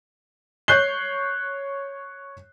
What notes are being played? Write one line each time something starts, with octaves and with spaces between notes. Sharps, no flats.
C#5 F#6 G6 C7 G7